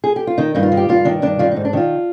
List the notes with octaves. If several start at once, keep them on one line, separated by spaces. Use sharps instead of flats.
G#4
G4
F4
D#3 D#4
G2 D#4
F4
D#3
G4
G2 F4
D#3 D4
G2 D4
D#3 F4
G#2 D#4
D4
D#3 F4